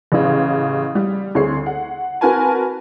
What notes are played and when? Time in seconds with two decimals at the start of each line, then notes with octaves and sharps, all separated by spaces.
0.12 A1 C#3
0.95 G3
1.35 D2 C4 G#4 C#5 C7
1.66 F#5
2.21 C4 F#4 A#4 B4 G#5 A5